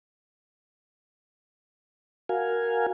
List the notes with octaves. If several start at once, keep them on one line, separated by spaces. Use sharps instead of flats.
F#4 A#4 F5 G#5